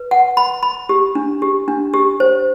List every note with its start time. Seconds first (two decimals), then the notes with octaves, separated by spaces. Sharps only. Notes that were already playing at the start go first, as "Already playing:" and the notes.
Already playing: B4
0.11 F#5
0.37 B5
0.63 B5
0.89 G4
1.15 D4
1.42 G4
1.68 D4
1.94 G4
2.20 C5